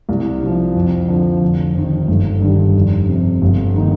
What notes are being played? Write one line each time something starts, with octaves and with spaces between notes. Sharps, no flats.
C2
C3 F3
F2
D3 F3
F1
F2 D#3
G1
G2 D#3 G3
F1
F2 C3
G1
D#3 A#3 D#4